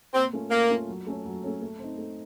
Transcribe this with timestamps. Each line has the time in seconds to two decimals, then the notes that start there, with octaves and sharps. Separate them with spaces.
0.14 A#2 C4
0.33 A3 C#4 F4 A#4
0.51 A#2 A#3
0.70 A3 C#4 F4 A#4
0.88 F#3
1.07 A3 C#4 A4 C#5
1.25 F#3
1.43 A3 C#4 A4 C#5
1.62 A3
1.79 C4 D#4
1.98 A3